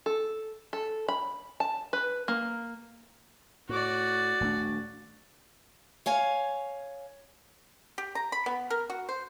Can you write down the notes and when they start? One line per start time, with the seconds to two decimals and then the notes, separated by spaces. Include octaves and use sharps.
0.06 A4
0.73 A4
1.08 B5
1.60 A5
1.93 B4
2.28 A#3
3.69 A2 F#4 D5
4.41 D#1 A3 D4
6.06 C#5 F5 G#5
7.98 G4
8.15 A#5
8.32 B5
8.46 B3
8.70 A#4
8.90 F#4
9.09 C5